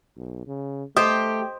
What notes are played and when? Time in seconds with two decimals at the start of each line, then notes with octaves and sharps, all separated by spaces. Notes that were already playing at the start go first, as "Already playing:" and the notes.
0.17 B1
0.47 C#3
0.96 A3 G4 C5 D#5 D#6